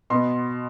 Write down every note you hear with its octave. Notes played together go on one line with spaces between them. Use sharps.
B2 B3 C6